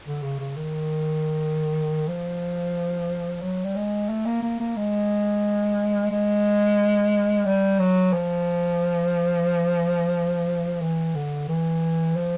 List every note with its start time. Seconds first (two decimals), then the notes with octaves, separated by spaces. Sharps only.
0.06 D3
0.22 C#3
0.39 C#3
0.56 D#3
2.08 F3
3.42 F#3
3.64 G3
3.76 G#3
4.09 A3
4.26 A#3
4.43 A#3
4.60 A#3
4.77 G#3
6.11 G#3
7.45 G3
7.79 F#3
8.13 F3
10.81 E3
11.15 D3
11.49 E3
12.16 F3